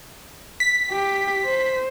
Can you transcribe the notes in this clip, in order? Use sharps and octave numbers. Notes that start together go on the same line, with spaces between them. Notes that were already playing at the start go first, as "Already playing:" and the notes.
B6
G4
C5